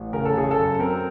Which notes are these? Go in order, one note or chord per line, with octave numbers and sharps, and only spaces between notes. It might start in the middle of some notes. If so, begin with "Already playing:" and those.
Already playing: A1
C#3 A#4
A4
C#3 G#4
A4
F#2
C4 A#4